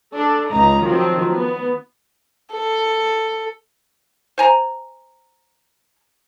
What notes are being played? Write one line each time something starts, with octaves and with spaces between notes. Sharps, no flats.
D4 A4
C#2 D#4 A#5
D#3 F3 F#3 C4
B3
A4
C5 G#5 A#5